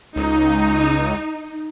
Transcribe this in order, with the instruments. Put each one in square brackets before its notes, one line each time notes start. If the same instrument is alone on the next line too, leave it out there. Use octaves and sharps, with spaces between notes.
[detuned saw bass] C#2 [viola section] D#4